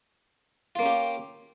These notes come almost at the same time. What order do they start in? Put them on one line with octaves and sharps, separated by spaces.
F4 A#3 C#4 G4